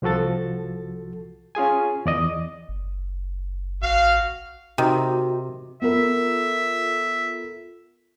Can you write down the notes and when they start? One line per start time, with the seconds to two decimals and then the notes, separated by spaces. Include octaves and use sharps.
0.02 C2 F3 F#4 A4 A6
1.55 C#4 F4 G#4 G#5
2.06 E2 D5 D#5
2.69 F#1
3.83 A1 F#4 F5
4.78 C3 D#3 F#4
5.82 B3 F4 A4 A#4 E5